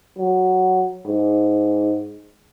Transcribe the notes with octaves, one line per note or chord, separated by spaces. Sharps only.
F#3
G#2